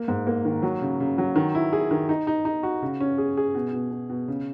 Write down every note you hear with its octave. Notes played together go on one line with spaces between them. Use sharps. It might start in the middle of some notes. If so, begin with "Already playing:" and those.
Already playing: A#3
G#2
A#3
D#3
F#3
C#3
C#3
F#3
D#3
E4
G#4
D#3
D#4
D#4
D#4
F#4
C#3
C#4
G#4
G#4
B2
B2
B2
B2
C#3